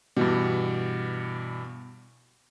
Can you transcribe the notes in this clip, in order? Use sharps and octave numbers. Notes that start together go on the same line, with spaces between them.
G2 B2 E3 G3